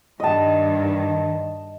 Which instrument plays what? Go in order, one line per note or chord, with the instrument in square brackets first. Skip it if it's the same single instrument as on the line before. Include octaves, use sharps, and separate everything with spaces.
[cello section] G2 D#3 [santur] D#5 A5